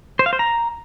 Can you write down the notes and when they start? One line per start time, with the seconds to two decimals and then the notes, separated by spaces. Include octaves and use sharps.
0.19 C5
0.26 F5
0.33 C5
0.39 A#5